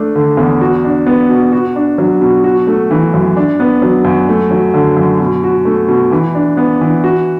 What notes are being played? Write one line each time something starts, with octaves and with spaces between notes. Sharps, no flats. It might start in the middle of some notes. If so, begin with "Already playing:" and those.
Already playing: A3 D4
D3
E2
F#4
D4
B3
B2
F#4
D4
F#3
B2
F#4
A3
E3
F#2
D4
B3
F#3
F#2
A3
F#3
D3
F#2
B2
F#4
A3
B2
E3
D4
B3
E3
F#4